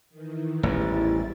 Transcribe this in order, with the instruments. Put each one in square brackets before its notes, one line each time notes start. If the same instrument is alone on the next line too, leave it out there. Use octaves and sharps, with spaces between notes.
[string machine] D#3 E3
[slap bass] A1 E2 G#2 [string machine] G3 E4 A6